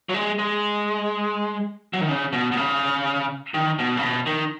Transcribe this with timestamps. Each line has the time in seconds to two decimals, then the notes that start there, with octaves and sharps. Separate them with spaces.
0.09 F#3
0.14 G#3
0.39 G#3
1.93 F#3
2.01 D#3
2.08 C#3
2.33 B2
2.52 B2
2.57 C#3
3.54 D#3
3.79 B2
3.97 C#3
4.02 B2
4.26 D#3